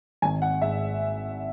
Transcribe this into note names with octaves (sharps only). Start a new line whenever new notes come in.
G#1 G#5
F#5
G#2 E5